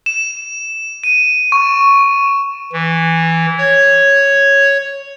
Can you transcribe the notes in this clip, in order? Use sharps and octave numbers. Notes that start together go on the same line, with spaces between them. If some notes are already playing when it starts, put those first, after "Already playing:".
E7
D#7
C#6
E3
C#5